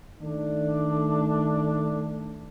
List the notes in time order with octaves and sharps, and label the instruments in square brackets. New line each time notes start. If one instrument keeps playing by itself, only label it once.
[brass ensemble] D#3 A3 D4